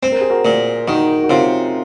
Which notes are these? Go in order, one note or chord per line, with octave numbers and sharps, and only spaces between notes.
C4 C5
A#4
G#4
F#4 A#4
A#2
D#3 D#4 F#4
F#4
C3 C#4 F4